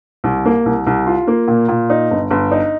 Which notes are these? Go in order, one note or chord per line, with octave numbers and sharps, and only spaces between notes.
C2
A#3
C2
C2
F4
A#3
A#2
A#2
D#4
G1
G1
D#4